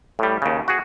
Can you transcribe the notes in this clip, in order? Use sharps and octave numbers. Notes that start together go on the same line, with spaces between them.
A2 G3
D#2 C#3
F#4 G#4